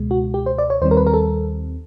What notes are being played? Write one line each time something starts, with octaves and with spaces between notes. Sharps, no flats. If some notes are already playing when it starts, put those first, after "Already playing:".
Already playing: C#2 B2 G#3
F#4
G4
C5
D5
C#5
D#2 D#3 G3 C4 C5
A#4
B4
A#4
A4